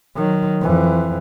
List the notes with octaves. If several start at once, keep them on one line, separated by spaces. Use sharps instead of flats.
D#3 F#3
F2 E3